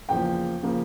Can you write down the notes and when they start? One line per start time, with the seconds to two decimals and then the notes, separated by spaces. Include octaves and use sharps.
0.09 E2 C#3 F3 A#3 G5
0.63 C#3 F3 A#3